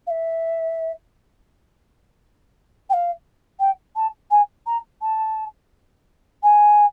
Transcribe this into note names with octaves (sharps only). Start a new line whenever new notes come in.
F5
E5
G5
F5
G5
A5
G#5
A#5
A5
G#5